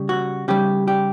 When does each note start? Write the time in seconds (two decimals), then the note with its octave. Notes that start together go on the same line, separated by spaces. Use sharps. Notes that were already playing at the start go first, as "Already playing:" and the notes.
Already playing: C#3 G3
0.09 F#4
0.48 C#3 G3 G4
0.88 G4